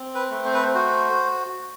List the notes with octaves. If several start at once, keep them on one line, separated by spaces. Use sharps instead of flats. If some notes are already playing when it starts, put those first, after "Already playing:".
Already playing: C4
B4
A3
C5
B4
C5
F#4 C5